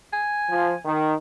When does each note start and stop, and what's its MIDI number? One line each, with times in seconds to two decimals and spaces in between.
0.13 0.82 80
0.50 0.72 53
0.84 1.13 51